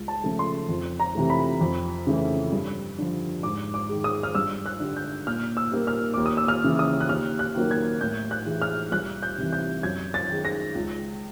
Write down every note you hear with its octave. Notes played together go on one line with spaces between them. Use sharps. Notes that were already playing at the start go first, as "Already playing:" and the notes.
Already playing: C#2
A5
C#3 F3 A3
C6
F2
A#5
C3 E3 A3
B5
F2
C#3 E3 A3
G2
D3 F3
G#2 D6
D6
D#3 G#3
D#6
F6
G2 E6
F#6
D3 G3
G6
A#2 F6
E6
G3 A#3
F6
D#2 D6
D#6
E6
F6
C#3 E3
D#6
F#6
D#2 F6
F#6
D#3 F#3 A#3
G#6
A2 G6
F#6
E3 G#3
F6
C2 F#6
G6
C3 E3
G6
F#2 G#6
A6
D#3 G#3
A#6
C#2